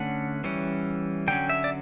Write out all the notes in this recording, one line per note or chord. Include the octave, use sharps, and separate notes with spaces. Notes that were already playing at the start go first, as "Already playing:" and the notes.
Already playing: D3 A3 C#4 F#5
E3 G3 C#4
D3 F#3 C#4 G5
E5
D5